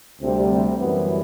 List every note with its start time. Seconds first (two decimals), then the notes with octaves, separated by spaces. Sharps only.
0.20 D2 C3 G3 C4
0.50 C4
0.78 F#2 E3 G3 B3